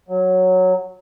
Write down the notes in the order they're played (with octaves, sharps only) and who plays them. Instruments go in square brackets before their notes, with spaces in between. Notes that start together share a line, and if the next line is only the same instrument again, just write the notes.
[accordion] F#3